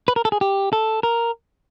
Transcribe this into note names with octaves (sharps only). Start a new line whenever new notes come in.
B4
A#4
A4
G#4
G4
A4
A#4